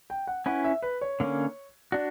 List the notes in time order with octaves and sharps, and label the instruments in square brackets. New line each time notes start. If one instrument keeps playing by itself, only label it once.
[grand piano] G5
F#5
[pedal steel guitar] C#4 E4 B4 [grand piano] F#5
[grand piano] E5
B4
C#5
[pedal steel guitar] D3 A#3 C#4
[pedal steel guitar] D4 F#4 [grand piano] D5